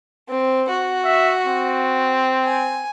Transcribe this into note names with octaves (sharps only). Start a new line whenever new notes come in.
C4
F#4
E5
C4
G#5